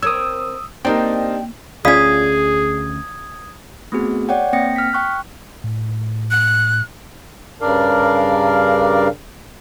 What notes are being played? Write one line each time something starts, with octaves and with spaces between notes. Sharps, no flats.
C4 A#4 C#5 D#6 E6
A#3 C4 D4 D#4 G4 A#4 G5
D2 C#4 F4 G#4 D5 F5 D#6 G#6
A3 B3 C4 F#4 G#4
C#5 D5 F#5 G5
A#3 C4 G5 A#6 C#7
F6 B6
G5 C#6 F#6
A2
F#6
G2 C#3 D4 A#4 D5 F5